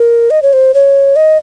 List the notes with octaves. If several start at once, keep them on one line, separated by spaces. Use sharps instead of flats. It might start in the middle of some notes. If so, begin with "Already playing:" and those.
Already playing: A#4
D#5
C#5
C5
C#5
D#5